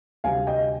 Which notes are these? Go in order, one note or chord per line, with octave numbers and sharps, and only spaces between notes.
D2 C3 G3 F5 G#5
D#5 G5